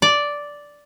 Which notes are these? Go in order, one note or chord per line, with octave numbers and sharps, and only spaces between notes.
D5